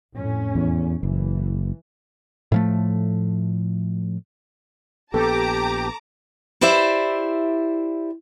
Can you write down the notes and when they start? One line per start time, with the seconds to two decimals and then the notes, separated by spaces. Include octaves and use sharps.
0.15 F2 A2 C#4
0.55 E2
1.03 F#1 E3
2.52 A2 F3 A3
5.14 A#1 B3 G4 A4 A5 A#5 D6
6.61 E4 G4 C5 D5 E5